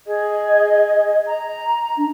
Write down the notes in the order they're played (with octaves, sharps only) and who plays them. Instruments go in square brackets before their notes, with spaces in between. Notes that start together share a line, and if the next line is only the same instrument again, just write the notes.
[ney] G#4 [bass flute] D#5
[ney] A#5
[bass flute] D4